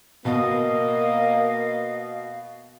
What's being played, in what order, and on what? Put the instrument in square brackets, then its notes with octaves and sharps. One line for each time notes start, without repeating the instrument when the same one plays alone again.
[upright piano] B2 [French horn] A#3 [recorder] D#5 [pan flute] F5